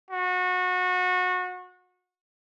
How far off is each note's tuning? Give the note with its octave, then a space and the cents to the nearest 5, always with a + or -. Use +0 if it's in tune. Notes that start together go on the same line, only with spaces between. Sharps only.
F#4 -25